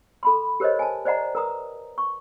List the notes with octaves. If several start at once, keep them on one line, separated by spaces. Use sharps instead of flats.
A4 B5 C6
G4 A#4 C5 C#5 D#5
G#5 A5
C5 D5 D#5 F#5 A#5
A#4 B4 A#5 D#6
C#6